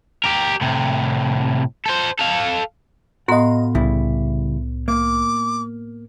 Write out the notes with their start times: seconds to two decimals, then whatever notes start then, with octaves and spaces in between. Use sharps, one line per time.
0.24 G4 A#4
0.61 A2 C3
1.86 A4 C5
2.19 A4 F5
3.28 A2 B3 F#4 D#5 F5 A#5 C6
3.75 C2 C#3 G3 E4
4.88 A#3 D6